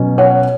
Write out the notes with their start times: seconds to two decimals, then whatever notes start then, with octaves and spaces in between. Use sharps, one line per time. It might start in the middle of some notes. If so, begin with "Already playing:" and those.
Already playing: B2 F#3 C#4
0.18 C#5 F#5